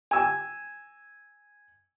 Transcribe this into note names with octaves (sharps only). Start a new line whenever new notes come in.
G#5 E6